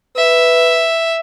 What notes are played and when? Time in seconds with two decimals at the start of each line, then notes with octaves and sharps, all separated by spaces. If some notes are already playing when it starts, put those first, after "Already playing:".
0.16 B4 E5